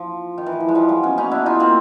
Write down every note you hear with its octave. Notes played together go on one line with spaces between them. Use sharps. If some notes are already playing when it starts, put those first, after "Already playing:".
Already playing: F3
D#3
E3
F3
G#3
F3 G3
F#3 G#3
B3 C#4
C#4 D#4
D4 E4
D#4 F4
A#3 C4